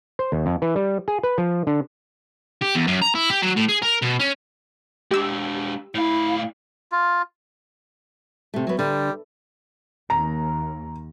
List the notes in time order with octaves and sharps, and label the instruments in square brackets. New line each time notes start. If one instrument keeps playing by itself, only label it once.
[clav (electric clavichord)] C5
D#2
F2
E3
G3
G#4
B4
F3
D3
[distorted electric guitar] G4
E2
F#2
A#5
E4
G4
F#3
A2
G#4
A#4
B2
C#4
[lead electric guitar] G#3 D4 [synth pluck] G4 E6
[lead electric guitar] A2 F5 [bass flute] E4
[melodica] F4
[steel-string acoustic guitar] C3 A3
F#3 B3
[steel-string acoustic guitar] D3 [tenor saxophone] G3
[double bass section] D#2 [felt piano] A#5